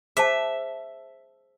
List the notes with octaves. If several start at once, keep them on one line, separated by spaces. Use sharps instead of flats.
G#4 C5 E5 A5